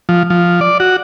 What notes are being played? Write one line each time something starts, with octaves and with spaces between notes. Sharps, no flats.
F3
F3
D5
F#4